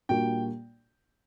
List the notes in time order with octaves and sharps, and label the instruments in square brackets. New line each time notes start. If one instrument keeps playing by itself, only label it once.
[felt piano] A#2 G3 A#3 D4 F#4 [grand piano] G5